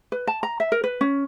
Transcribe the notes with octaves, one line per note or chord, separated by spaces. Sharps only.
B4
A5
A#5
E5
A#4
B4
C#4